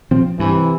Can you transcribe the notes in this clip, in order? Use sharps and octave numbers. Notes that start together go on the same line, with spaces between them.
A#2 F3 C4
G2 C3 E3